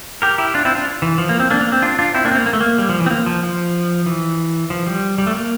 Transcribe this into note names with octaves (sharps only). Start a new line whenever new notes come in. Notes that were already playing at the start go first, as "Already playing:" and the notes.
G4 A#4
E4 G4
D4 F4
C4 E4
D4 F4
E3
F3
A#3
C4
A#3 D4
A#3
C4
D4 F4
D4 F4
C4 E4
A#3 D4
C4
A#3
A#3
A3
A#3
G3
F3
E3
C4
A#3
F3
F3
E3
F3
G3
G3
A3
A#3